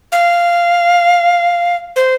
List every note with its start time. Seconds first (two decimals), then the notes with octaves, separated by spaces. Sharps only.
0.12 F5
1.96 C5